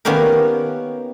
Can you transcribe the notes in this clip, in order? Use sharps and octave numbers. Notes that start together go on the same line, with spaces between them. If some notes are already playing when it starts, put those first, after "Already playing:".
D#3 A#3 B3 C#4 G4 A#4